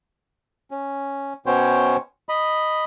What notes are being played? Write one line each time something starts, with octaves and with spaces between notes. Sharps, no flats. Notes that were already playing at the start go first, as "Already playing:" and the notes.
C#4
B2 B3 C#4 C5 C#5 G5
D#5 B5